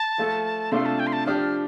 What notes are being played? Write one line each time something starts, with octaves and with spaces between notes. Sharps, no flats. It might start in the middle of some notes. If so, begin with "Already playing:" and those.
Already playing: A5
F3 A3 F4 A4
C3 A3 D4 F4 A4 C6
A5
G5
C6
A5
F3 D4 G4 F6